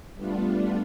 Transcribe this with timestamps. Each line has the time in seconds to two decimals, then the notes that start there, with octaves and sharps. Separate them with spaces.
0.15 G3 A3 B3 D4 F4